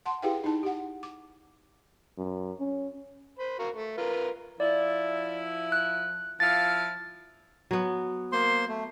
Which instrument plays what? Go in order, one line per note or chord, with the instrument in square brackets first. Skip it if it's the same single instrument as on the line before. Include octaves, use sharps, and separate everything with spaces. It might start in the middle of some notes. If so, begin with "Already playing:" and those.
[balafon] F#5 A5 C6
E4 G4 G#4 B4 F5 G5
D#4 E4 A5
G4 F#5
D6
[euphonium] F#2
C#4
[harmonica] C5 B5
F#4 A#4 F5
A3
F4 A#4 B4
[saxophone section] F3 E4 [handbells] D5
[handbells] F#6
[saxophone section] F3 E4 F5 [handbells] A6
[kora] F#3 B3
[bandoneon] A#3 C5 C6
A3